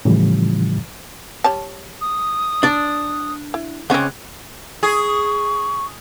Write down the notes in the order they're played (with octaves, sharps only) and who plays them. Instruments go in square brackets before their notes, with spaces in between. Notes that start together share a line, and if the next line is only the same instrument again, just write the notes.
[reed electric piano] A2 C#3 E3 F3 G3
[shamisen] G3 C#5 A5
[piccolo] D#6
[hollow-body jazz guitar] D4 D5
[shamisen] E4
[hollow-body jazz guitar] C#2 C#4 [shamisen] C4 F#5 [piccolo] F#6
[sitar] G#4 [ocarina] C#6